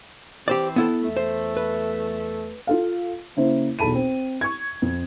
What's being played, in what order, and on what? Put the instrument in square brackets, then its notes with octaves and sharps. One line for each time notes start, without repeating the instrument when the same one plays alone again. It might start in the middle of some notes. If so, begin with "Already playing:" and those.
[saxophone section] E3 C4 [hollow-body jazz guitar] G4 C5 D5
[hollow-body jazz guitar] B3 E4 A4
[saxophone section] E2 A3
[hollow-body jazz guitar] C5
B4
[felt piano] F4 A4 F5
C#3 A#3 E4 C5
B1 E2 A4 A5 B5 D#7
C4
C#6 G#6
F2